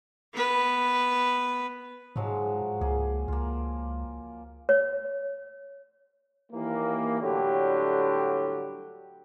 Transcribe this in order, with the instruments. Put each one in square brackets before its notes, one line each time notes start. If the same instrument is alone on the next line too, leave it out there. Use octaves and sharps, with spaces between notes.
[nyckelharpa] B3 B4
[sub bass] G#2 [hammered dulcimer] F3 F#3 G#3
[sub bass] C#2 [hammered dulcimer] A#3 G#4
[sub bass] C#2 [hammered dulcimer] A#3 F4
[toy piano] C#5
[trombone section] D#2 E3 A#3
A2 D3 F#3 G3 G4